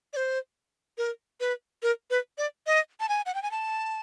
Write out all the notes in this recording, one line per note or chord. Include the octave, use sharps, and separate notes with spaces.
D5
C5
A#4
B4
A#4
B4
D5
D#5
A5
G#5
F#5
G5
G#5
A5